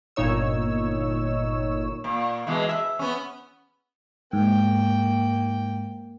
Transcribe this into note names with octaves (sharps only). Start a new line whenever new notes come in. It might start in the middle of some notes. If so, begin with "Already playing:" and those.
G1 A#2 D#4 C#5 E6
A#2
B2 E3 G#3
E5
B3 C#4
G#2 A#3 G5